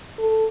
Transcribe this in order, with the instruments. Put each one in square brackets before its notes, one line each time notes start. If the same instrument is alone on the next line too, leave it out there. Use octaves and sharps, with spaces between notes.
[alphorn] A4